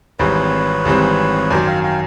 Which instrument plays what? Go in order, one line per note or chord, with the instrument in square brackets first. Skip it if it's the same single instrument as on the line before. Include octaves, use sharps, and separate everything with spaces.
[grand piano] G#1 G#2 E3 G3 C4 [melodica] B4 C#5
[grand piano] G#1 G#2 E3 G3 C4
[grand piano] F#2 D#3 F#3 [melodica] C5 D5
[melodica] F5 G5
F5 G5